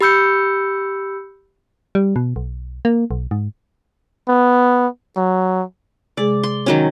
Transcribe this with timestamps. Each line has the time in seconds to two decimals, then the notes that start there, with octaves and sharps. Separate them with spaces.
0.01 G4 B5 E6 G6 C#7
1.95 G3
2.16 B2
2.36 B1
2.85 A#3
3.11 B1
3.31 G#2
4.28 B3
5.16 F#3
6.17 C3 G#3 G#4 D5
6.43 C6
6.66 D#3 F#3 C#4